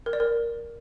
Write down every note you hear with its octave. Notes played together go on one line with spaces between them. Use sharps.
A#4
D5
A#4